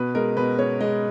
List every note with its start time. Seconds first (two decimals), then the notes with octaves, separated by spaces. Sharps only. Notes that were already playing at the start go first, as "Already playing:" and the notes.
Already playing: B2 B4
0.15 G#3 A#4
0.37 B2 B4
0.59 G#3 C#5
0.81 G#3 D#5